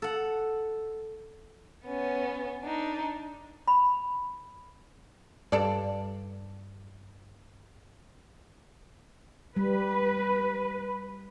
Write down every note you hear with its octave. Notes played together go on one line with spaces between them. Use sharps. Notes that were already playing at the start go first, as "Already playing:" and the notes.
A4 F#5
B3 C#4
D4 D#4
B5
G2 D4 A4 D5
G3 B4